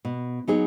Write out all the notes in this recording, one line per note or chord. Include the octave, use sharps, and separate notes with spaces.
B2
F#3 B3 D#4 G#4